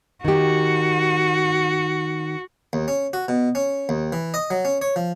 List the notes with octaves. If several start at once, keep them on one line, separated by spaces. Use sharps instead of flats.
D#3 F#4 G4
D#2
C#4
F#4
B2
C#4
D#2
E3
D#5
F#3
C#4
C#5
F3